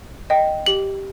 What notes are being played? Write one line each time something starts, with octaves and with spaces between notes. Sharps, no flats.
D#5 G5
G4 F#7